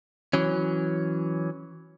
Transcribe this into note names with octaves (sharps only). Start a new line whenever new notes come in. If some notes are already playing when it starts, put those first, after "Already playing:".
E3 F#3 C#4